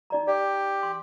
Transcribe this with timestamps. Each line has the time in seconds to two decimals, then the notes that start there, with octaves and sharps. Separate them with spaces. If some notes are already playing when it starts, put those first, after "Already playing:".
0.10 D#4 D5 A#5
0.27 G4 D5
0.83 C6